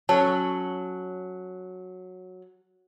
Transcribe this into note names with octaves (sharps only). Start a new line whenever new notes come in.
F#3 C#4 A4 A5